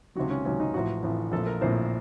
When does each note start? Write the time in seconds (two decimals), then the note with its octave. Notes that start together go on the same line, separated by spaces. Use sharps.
0.15 C#2 C3 D#3 F#3 F#4
0.31 C#4
0.45 C#2 C3 D#3 F#3 C#4
0.60 D#4
0.74 A1 A2 F3 F#4
1.03 A1 A2 F3
1.32 A#1 A2 F3 A4
1.47 A#4
1.61 A#1 A2 F3 C5